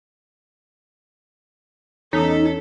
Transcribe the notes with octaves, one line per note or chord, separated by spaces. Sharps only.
E2 C#4 D#4 A4 B6